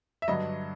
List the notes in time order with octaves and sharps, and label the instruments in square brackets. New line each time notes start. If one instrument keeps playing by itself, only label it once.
[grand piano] E5
G2 D3 F#3 D#5